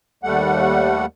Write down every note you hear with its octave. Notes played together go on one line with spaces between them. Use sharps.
D#2 G3 A3 F#5